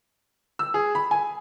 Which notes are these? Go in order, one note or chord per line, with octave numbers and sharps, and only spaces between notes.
E6
G#4
B5
G#5